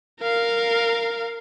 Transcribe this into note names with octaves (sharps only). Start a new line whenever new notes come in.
A#4 F5